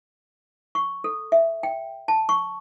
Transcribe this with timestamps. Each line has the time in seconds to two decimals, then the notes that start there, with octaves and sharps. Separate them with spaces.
0.75 C#6
1.04 A4
1.32 E5
1.63 G5
2.08 A5
2.29 C#6